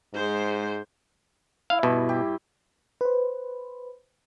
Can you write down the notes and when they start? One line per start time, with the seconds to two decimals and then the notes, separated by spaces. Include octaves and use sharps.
0.14 G#2 G#3 C5
1.70 E4 F5
1.83 G2 B2
2.09 G4
3.01 B4 C5